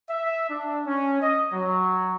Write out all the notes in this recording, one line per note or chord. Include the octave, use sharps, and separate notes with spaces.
E5
D4
C#4
D#5
F#3